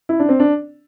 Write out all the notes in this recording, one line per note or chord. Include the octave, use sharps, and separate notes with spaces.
E4
D4
C4
D4